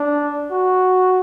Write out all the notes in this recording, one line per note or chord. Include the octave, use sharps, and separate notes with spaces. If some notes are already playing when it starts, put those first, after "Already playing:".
Already playing: D4
F#4